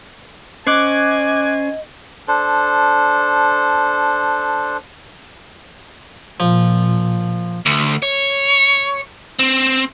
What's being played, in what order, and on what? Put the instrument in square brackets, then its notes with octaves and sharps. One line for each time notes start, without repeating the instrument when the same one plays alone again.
[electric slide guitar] C#4 C5 [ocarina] D#5 [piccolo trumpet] G#5 [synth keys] D6 F#6 G#6
[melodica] D4 A4 C5
[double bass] A#2 [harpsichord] F3
[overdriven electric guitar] D2
C#5
C4